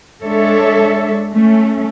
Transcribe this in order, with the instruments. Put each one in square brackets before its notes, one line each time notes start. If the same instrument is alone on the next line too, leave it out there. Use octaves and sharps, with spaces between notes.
[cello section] G#3 D4 A4 C#5 E5
A3 C#4